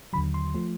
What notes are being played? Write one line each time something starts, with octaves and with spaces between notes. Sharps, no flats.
D#2 D3 F#3 B5
C6
F3 A3